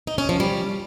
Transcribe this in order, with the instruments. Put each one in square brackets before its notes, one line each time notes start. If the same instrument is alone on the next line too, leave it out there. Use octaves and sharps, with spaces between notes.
[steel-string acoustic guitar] D#4
C#4
F3
G3